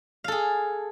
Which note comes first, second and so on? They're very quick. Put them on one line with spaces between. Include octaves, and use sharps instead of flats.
F5 A4 G#4